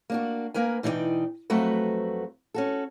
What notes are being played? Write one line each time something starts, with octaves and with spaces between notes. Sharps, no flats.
A#3 D4 F#4
A#3 A#4 B4 G#5
B2 E3 D#4 E4 D5 G5
F2 F#3 A3 F#4 B4
C#4 F#4 A4